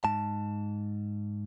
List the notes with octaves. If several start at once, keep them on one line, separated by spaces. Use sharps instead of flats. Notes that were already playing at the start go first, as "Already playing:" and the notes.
G#2 A5